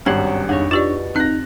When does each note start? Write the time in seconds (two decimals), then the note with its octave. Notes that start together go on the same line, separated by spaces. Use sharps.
0.06 G#1 G2 F#3 C#4 C5 F#5 G#6
0.49 F2 C#3 D4 D#4 C#5
0.71 B2 F4 G4 D5 C#6 A6
1.16 C4 D#4 F#6 A#6